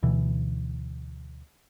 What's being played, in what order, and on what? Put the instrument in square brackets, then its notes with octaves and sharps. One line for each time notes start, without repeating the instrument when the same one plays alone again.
[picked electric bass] D2 B2 E3